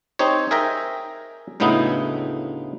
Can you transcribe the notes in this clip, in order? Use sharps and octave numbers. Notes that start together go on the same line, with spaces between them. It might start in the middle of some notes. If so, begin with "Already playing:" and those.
C4 D#4 G4 C5 C#5
G#4 A#4 E5 G5 G#5 A#5
D2 A2 C#3 B3 D#4 E4